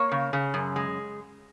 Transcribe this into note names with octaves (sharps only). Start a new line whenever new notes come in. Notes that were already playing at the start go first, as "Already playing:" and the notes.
Already playing: A#3 C#5
C#3
C#3
F#2
G#3